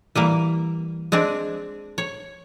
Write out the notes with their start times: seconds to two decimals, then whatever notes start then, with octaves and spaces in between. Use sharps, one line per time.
0.15 E3 G3 A#3
1.12 G#3 C4 D4
1.98 C#5